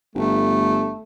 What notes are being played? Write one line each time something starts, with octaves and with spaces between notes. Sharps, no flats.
G1 A3